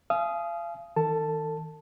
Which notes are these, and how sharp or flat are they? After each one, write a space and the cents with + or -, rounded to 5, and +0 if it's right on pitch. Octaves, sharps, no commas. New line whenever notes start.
F5 -35 G#5 +40 D#6 +5
D#3 +25 A4 +35 A5 +0